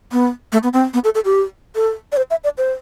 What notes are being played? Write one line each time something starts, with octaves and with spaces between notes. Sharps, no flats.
B3
A3
B3
C4
B3
A4
A4
G4
A4
D5
C5
E5
D5
C5